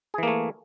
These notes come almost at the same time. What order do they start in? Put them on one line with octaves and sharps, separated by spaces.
G#4 E3 A#3 A3